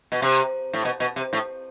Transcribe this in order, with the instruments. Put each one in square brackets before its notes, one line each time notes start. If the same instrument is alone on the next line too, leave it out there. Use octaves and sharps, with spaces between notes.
[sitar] B2
C3
A2
B2
B2
C3
A2